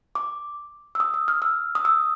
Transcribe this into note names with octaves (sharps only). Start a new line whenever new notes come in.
D6
E6
D#6
E6
F6
E6
D#6
E6